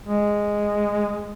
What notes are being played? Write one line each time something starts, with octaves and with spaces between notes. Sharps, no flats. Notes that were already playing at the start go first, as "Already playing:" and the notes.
G#3